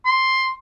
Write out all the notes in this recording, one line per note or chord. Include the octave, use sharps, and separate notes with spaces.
C6